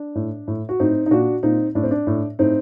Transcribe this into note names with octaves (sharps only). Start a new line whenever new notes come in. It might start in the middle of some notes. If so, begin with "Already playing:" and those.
Already playing: D4
A2
A2
F#4
A2 C4 D#4
D#4
A#2 D4 F#4
A#2 C4 D#4
A2 D4
C4
D4
A2
A2 C4 D#4